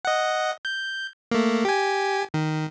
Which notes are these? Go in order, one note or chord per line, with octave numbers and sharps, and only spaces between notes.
D#5 F#5
G6
A3 A#3
G4 G#5
D#3